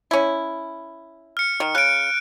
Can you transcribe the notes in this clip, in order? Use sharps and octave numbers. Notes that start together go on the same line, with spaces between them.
C#4 E4
F6 C#7
D#3
C#3 F#6 D7